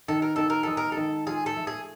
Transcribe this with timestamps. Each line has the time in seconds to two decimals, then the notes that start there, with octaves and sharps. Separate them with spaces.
0.08 D#3 A4
0.22 A#4
0.36 D#3 A4
0.50 A#4
0.63 G#3 A4
0.77 A#4
0.92 D#3 A4
1.27 F4 G#4
1.46 A4
1.57 A3
1.67 G#4